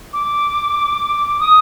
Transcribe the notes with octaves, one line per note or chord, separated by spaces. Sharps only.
D6
D#6